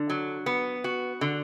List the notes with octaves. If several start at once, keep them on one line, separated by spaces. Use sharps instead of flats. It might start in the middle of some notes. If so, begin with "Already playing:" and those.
Already playing: D3
F#3
B3
F#4
D3